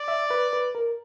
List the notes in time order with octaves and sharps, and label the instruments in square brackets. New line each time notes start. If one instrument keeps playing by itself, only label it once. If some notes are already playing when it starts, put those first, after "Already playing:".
Already playing: [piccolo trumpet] D5
[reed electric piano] E5
B4
B4
A#4